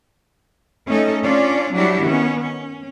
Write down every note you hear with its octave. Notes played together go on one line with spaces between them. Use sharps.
A3 C#4 D#4 A4 D#5
C#4 D4 F4 D5
F#3 G3 D4 E4 F#4 G4
D#3 B3 C#4
C#4